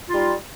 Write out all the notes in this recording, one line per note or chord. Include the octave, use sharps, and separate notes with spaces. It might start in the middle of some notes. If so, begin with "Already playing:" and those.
G3 D#4 F4